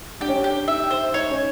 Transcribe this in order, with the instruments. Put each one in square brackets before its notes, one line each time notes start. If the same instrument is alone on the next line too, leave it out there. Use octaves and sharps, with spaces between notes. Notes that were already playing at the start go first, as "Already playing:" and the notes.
[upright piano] D4 [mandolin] G4
[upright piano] C#4
D4
[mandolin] G4
[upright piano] D#4 [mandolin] E5
[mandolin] C5
[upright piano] D#4 [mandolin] C#5
[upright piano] C#4